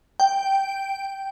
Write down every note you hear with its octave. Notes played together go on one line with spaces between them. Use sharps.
G5